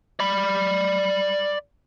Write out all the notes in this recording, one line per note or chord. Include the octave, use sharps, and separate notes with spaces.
D5 B5